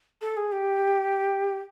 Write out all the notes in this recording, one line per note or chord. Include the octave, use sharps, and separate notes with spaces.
A4
G#4
G4